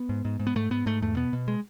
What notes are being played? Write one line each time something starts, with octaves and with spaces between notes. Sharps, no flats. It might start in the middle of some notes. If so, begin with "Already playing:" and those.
Already playing: B3
G#2
G#2
G#2
B3
G#2 A3
G#2 B3
G#2 A3
E2 A3
B2 B3
B2
G#3